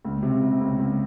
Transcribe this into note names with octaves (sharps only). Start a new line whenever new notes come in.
C#2
C3
C3
C#2
C#2